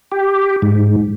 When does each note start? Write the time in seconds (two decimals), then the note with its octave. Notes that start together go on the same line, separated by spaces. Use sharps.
0.12 G4
0.62 G#2